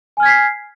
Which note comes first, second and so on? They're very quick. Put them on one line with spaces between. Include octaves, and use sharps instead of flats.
G#5 F6 G#6 B6 C7